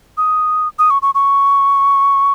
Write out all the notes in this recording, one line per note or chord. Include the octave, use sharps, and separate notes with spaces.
D#6
D#6
C#6
C#6
C#6